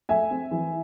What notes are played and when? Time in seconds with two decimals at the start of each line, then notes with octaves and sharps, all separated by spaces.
0.09 A3 E5 G#5
0.31 C4
0.51 E3